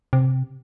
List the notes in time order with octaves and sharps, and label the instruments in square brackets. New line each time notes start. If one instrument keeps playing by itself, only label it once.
[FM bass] C3